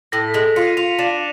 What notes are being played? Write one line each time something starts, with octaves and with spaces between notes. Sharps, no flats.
A2 A#6
B6
G#3 A#6
F4 C#7
D#7
F4 F7
D4 E7